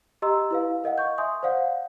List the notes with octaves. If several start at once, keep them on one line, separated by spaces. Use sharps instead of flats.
G4 D#5 A#5 C6 E6
E4 B4 F5
A#4 D#5 F5 F#5
D#5 C#6 G6
E5 G#5 C6 D#6 G6
C5 D5 F5 F#5